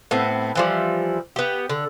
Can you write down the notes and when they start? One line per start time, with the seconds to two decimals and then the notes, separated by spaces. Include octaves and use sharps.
0.11 A2 B3 C4
0.55 E3 F3 G3
1.36 B3 G4
1.70 D3